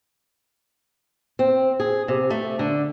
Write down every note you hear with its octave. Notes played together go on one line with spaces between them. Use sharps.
C4
G#4
C3
A3
D3